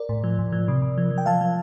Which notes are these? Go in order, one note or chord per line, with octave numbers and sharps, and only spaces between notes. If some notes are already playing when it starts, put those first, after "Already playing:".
Already playing: A#4 D5
A2
F3
A2
F3
C3
C3
F3
F3
G5
F3 F5 A5
F3